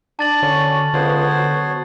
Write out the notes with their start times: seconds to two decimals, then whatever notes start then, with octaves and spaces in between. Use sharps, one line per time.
0.19 D4 A5 A6 F#7
0.42 D3 C#4 F#4 D5
0.94 C#2 D3 B3 C5 C#5
1.38 F#3